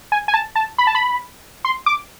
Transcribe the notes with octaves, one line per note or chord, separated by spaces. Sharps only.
G#5
G#5
A5
A5
B5
A5
B5
C6
D6